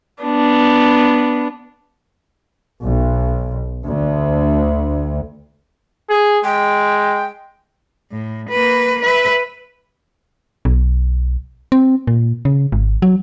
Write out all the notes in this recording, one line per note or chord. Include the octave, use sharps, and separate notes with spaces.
B3 D4
B1
D2
G#4
G#3 G5
A2
A#3 B4
B4 E5
B1
C4
A#2
C#3
G#1
F#3